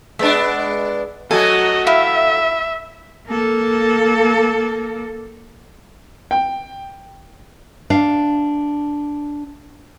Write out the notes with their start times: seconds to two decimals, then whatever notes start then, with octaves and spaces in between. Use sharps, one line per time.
0.19 G#3 B3 D4 E5
1.31 F#3 A3 F#4 A4 D#5 G#5
1.87 E4 E5 F5
3.27 A#3 A4
6.31 G5
7.90 D4 F5